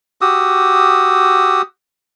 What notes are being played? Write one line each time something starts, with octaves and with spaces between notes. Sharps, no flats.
F#4 G4 D#6 E6